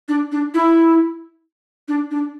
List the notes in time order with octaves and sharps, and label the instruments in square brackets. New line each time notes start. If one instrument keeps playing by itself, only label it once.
[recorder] D4
D4
E4
D4
D4